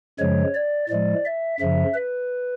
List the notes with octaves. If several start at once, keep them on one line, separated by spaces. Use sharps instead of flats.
F#2 C#3 F3 G#3 C#5
D5
A2 F3 G#3 D5
E5
F#2 C#3 F3 E5
B4